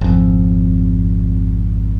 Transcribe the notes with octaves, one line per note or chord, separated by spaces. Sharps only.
G#1 F2